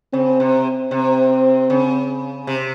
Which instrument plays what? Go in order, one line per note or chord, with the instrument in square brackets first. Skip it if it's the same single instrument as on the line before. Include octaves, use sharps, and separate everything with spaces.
[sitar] C#3 [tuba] C4
[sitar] C3
[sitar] C3 [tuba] C4
[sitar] C#3
C3